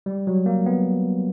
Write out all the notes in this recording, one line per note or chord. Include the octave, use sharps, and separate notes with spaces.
G3
F#3
A#3
B3